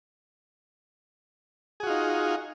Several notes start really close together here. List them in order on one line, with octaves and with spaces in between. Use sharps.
G#4 F#4 F4 D#4